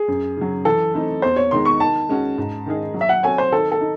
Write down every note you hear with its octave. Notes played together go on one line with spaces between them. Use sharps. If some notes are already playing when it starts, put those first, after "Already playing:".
Already playing: G#4
F#2
C#3 F#3
E3 A4
A3 C4 D#4
E2 C5
C#5
D#3 G#3 D#4 C6
C#6
D#3 A5
G#3 C#4 F#4
G#2
D#3 G#3 D#4 G#4
F#3
E5
F#5
C4 F#4 A4 C#5 G#5
C5
D#3 A4
A4
D#4